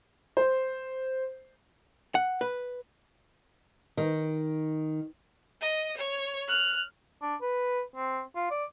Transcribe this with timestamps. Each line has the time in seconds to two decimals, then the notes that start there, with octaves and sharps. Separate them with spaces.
0.37 C5
2.15 F#5
2.41 B4
3.97 D#3
5.61 D#5
5.97 C#5
6.48 F6 F#6
7.22 D4
7.41 B4
7.96 C4
8.35 F4
8.50 D5